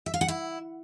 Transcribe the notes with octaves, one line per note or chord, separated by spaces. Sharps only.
E5
F5
F#5
E4